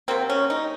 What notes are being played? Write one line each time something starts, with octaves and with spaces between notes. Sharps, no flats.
C3 F#3 A#3 C4
C#4
D#4